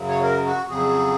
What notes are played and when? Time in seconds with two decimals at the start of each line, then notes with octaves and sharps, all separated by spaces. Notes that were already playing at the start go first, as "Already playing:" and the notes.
Already playing: F#2 C#3 F#3
0.09 C#5
0.23 A#4
0.46 F#4
0.69 F2 C#3 F#3 G#4